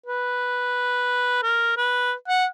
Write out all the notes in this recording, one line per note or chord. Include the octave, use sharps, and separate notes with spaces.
B4
A#4
B4
F#5